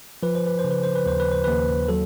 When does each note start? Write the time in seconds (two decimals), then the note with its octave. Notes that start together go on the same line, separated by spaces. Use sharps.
0.23 F3 B4
0.35 C5
0.47 B4
0.59 C5
0.64 C#3
0.71 B4
0.83 C5
0.96 B4
1.06 D#2 C5
1.20 B4
1.32 C5
1.44 D#2 B4
1.88 F#3 A4